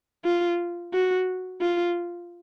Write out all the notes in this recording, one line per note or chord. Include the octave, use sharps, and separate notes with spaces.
F4
F#4
F4